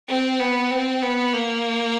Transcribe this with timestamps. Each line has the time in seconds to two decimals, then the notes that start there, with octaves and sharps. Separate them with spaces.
0.09 C4
0.40 B3
0.71 C4
1.02 B3
1.33 A#3